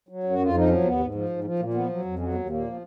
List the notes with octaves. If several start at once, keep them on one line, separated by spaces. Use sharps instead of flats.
F#3
F#2
F#4
F2 F4
F3 D#4
F#3 C#4
D#2 B3
G#2
F3
G#2
F3
A#2 A#3
F3 B3
F#3
F2
F#3 C#4
D#2 B3
A#2 A#3
F3